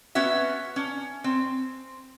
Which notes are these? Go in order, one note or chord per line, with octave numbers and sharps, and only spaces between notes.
B3 C#4 F#4 E5
C#4
C4